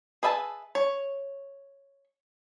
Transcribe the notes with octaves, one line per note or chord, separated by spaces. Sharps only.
G#4 B4 E5 G#5 A5
C#5